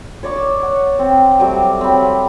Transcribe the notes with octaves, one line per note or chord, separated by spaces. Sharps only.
C#5 D5 C#6
E6
F#5
C4
F#3 G3 A3 D6
C4 B5